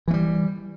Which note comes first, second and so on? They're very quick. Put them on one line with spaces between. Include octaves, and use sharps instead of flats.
E3 A3 G3